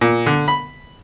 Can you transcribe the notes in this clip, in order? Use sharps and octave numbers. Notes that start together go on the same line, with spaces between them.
A#2
D3
B5